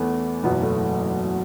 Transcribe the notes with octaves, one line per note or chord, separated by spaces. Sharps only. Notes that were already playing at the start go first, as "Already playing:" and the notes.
Already playing: E2 E3 A3 B3
F#1 E2 B2 F#3 B3
A3